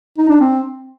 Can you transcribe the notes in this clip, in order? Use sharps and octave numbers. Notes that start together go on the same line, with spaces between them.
D#4
D4
C4